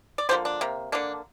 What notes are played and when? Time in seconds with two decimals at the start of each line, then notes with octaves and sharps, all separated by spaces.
0.18 D5
0.29 D3 F3 A#3 G4 C5
0.45 D4
0.61 C3 A#3
0.92 D3 A#3 D4